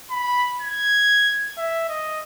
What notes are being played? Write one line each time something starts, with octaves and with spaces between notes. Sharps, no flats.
B5
G#6
E5
D#5